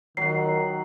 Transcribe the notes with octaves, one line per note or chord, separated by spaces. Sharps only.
D#3 F#3 F#5 C7